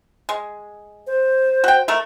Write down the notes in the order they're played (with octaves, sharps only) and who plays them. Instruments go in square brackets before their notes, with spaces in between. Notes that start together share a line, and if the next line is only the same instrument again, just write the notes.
[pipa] G#3
[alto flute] C5
[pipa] F#4 G5
A3 A4 A#4